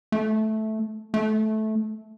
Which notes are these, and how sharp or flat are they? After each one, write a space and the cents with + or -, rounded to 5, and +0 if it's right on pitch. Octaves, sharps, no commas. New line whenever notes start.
A3 -10
A3 -15